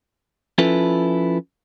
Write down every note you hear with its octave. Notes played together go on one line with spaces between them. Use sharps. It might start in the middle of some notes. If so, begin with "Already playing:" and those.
F3 C#4 E4 F4 A4 B4